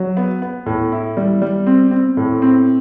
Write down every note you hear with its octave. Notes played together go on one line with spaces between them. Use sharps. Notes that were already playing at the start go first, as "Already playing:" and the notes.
Already playing: F#3
B3
B3
A2
E4
G3
G3
C4
C4
A2
C4